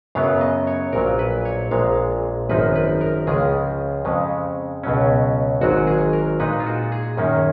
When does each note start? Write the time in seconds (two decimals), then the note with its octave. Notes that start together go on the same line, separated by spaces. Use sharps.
0.15 F#2 C#3 F#3 B3 F5
0.41 D#5
0.67 C#5
0.93 A#1 A#2 F#3 A#4
1.19 B4
1.45 C#5
1.71 A#1 A#2 G#3 F5
2.49 G#1 F#2 F3 A#3 D#4 B4
2.75 B4
3.01 A#4
3.27 C#2 C#3 F3 G#3 G#4
4.05 F2 C#3 G#3
4.84 C#2 B2 F#3 C#4
5.61 G#1 G#2 F#3 F#4
5.87 G#4
6.13 A#4
6.40 A#2 G#3 D#4 B4
6.60 F4
6.66 F#4
6.92 G#4
7.17 F#2 D#3 A#3 C#4